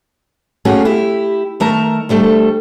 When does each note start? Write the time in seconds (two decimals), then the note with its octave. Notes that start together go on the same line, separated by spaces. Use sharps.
0.65 A3 A#3 C#4 F#4 G#4
0.85 E4 G4
1.60 D#3 A3 A#4 A5 A#5
2.09 D2 G3 A3 A4